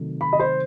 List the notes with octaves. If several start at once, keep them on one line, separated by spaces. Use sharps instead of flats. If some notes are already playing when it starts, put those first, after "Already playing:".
Already playing: C3 D#3 F#3 A3
B5
D#5
C5